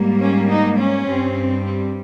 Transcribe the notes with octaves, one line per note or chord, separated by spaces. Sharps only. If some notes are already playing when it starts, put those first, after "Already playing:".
Already playing: G#2 G3 A#3
C#4
D#4
C#4
G2 G3 C4
C4